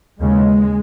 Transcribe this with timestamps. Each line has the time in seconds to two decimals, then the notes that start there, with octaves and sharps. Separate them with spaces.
0.20 D#2 C#3 G#3